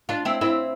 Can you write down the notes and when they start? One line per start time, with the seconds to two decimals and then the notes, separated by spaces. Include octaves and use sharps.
0.09 D4 F4
0.25 C4 E4
0.41 C4 E4